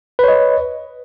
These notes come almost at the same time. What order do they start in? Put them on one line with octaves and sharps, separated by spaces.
B4 C#5 D#5